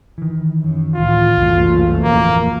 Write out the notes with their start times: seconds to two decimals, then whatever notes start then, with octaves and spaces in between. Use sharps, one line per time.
0.18 D#3 E3
0.63 F#2
0.96 C#2 A2 F4
1.36 F#1 C2 F#2 B2 E3 A3
2.03 D1 E2 F3 A#3